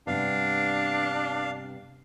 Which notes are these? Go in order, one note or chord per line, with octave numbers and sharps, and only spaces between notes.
G2 C3 B3 D4 F5